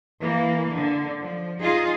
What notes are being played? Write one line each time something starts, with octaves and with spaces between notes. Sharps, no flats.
E3 A#3
D3
F3
D#4 F4 G#4